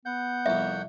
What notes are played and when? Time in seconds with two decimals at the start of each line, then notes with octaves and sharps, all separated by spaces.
0.05 B3 F#5 G6
0.46 C2 F2 E5